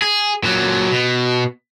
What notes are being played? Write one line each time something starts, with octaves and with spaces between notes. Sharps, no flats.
G#4
A#2 F#3
B2